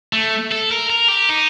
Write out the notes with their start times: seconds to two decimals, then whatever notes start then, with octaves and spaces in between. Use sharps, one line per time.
0.13 A3
0.51 A4
0.71 A#4
0.90 A#4
1.08 G4
1.29 D#4